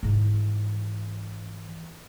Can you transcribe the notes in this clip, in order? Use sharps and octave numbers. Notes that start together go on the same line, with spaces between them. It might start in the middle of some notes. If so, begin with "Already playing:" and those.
G#2 E3